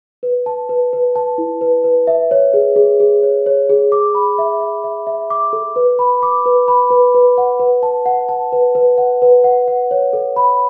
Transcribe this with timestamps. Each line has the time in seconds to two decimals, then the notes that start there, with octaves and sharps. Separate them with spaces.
0.23 B4
0.46 A5
0.69 B4
0.93 B4
1.16 A5
1.38 E4
1.61 B4
1.84 B4
2.07 E5
2.31 C#5
2.54 G#4
2.76 G#4
3.00 G#4
3.23 C#5
3.46 C#5
3.69 G#4
3.92 D6
4.15 B5
4.38 E5
4.60 E5
4.84 E5
5.07 E5
5.30 D6
5.53 A4
5.76 B4
5.99 B5
6.23 D6
6.46 B4
6.68 B5
6.91 B4
7.15 B4
7.38 F#5
7.60 B4
7.83 A5
8.06 F#5
8.29 A5
8.52 B4
8.75 B4
8.98 F#5
9.22 B4
9.44 F#5
9.68 F#5
9.91 C#5
10.13 A4
10.36 B5